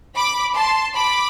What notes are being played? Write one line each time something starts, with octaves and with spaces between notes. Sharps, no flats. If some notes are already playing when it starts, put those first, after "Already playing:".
B5 D6
A5 C6
B5 D6